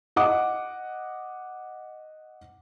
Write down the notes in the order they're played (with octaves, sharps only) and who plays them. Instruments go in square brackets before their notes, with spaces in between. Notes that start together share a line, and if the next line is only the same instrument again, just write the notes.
[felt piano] D#5 F#5 D6